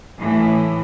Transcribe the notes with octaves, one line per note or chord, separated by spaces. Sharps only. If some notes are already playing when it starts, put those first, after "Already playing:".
A2 E3